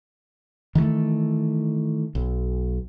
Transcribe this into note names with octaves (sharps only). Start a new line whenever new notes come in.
D#3 E3 G3 A3
B1